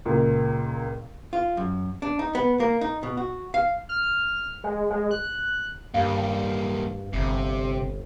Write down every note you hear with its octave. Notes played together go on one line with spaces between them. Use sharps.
C#2 A#2
F4
F#2
D4
D#4
B3
A#3
D#4
B2
F#4
F5
F6
G#3
G#3
F#6
G2 G3 A#3 F5
G1 C3